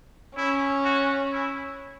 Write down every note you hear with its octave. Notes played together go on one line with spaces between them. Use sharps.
C#4 E4
F#4
E4